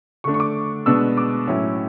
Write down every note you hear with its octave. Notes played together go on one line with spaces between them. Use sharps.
D3 A3 D4 C#6
C#6
D6
B2 G#3 B3 D4 E6
D6
A2 F#3 C#4 E4